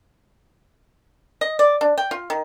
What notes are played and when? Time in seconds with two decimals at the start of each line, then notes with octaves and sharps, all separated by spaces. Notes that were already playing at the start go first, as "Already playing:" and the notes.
1.41 D#5
1.59 D5
1.81 D4
1.98 G5
2.11 F4
2.30 D#3